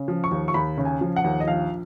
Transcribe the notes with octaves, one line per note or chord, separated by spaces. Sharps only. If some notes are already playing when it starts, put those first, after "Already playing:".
Already playing: C#3
F3
C#6
D#2
C#6
D#2 B5
C#3
G#5
F3
F#5
D#2
D#5
A#1 F5